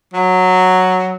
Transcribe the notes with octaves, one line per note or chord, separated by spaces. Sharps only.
F#3